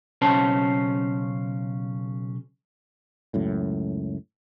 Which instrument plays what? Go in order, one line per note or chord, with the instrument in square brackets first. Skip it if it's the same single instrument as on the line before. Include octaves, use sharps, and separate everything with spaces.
[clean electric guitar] B1 C#3 C#4 C5 A5
[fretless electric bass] C#2 F#2 A2